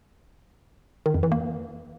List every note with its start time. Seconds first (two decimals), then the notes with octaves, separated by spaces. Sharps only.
1.06 D#3
1.14 F2
1.23 E3
1.32 A#3